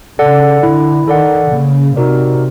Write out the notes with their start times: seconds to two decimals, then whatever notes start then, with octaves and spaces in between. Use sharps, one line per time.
0.19 C#3 A4 D5 F#5
0.63 D3 E4
1.08 D#3 A4 D5 F#5
1.52 C#3 A#3
1.96 C3 D#4 F#4 A#4 D5